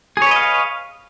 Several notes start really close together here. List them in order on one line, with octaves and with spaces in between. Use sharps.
G#4 C#5 B4 D#5 F5